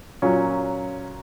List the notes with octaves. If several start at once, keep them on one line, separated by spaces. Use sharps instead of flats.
A#2 F#3 C#4